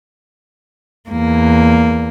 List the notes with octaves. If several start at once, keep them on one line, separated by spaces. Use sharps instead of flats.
E2 A#3